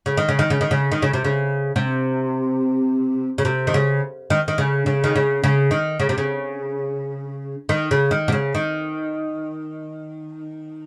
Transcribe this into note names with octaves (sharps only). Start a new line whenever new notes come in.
C#3
D#3
C#3
D#3
C#3
D#3
C#3
D#3
C#3
C3
C#3
C3
C#3
C3
D#3
C#3
D#3
D#3
C#3
C#3
D#3
C#3
C#3
D#3
C#3
C3
C#3
D#3
C#3
D#3
C3
C#3
D#3